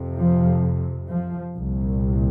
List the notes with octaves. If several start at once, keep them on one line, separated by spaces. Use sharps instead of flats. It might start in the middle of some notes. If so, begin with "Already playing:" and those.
Already playing: F2 C3
F3
F3
C2 A#2